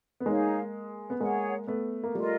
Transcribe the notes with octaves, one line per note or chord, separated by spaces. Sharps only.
B3
G#3 A#3 D#4 G#4 C#5 F5
B3
G#3 A#3 G#4 C#5 F#5
A3 B3
A#3
G3 A3 F4 A#4 D#5